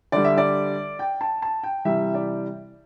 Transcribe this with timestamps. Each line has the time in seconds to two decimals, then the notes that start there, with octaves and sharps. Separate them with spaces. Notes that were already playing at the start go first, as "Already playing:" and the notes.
0.12 D3 G3 D5
0.24 E5
0.38 D5
0.99 G5
1.21 A5
1.42 A5
1.63 G5
1.85 C3 E3 G3 E5
2.14 D5